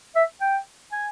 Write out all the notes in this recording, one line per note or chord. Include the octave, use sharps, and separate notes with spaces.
E5
G5
G#5